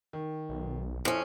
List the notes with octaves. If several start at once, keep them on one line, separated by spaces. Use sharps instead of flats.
D#3
B1
F2 C#4 E4